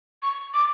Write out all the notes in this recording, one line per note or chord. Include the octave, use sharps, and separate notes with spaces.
C#6
D6